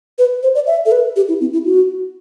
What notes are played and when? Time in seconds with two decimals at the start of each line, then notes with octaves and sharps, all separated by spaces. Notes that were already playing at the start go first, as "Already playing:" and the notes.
0.19 B4
0.43 C5
0.55 D5
0.67 E5
0.86 A4
0.92 B4
1.16 G4
1.28 E4
1.41 C4
1.53 E4
1.65 F#4